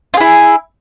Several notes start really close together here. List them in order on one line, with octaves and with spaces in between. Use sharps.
F4 G#4 E4